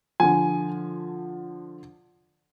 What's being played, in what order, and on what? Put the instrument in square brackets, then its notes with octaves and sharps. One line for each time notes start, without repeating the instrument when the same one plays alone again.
[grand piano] D3 F3 G#5